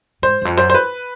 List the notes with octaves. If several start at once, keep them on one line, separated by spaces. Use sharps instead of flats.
G#2 C5
E2
F2
F#2 C5
C5
B4